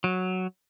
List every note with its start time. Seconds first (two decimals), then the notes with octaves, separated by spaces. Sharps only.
0.04 F#3